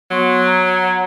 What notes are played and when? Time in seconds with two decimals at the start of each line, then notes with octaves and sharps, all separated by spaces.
0.11 F#3 B3 C6 C#6
0.47 A#5